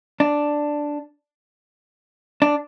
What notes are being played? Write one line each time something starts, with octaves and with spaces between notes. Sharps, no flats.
D4
D4